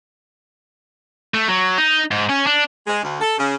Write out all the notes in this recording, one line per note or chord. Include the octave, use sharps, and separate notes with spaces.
A3
F#3
D#4
G#2
C#4
D4
G#3
D2
A4
C#3